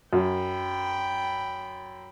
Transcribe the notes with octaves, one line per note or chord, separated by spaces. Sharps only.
F#2 G5 B5